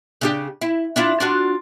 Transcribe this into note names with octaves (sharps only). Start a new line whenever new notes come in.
C#3 D4 G4
E4
D4 E4 F4
D4 F4 F#4